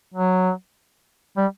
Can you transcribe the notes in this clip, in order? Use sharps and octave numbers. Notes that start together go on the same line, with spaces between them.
F#3
G3